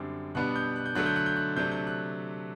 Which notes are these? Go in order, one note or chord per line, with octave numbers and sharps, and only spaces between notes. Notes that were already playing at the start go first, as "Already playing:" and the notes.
Already playing: F#2 D3 G3 C4 D6
B2 G3 B3 D4 F#6
G6
F#6
G6
D3 F#3 A3 D4 F#6
G6
F#6
G6
F#6
C3 F#3 A3 D4 G6
G6
F#6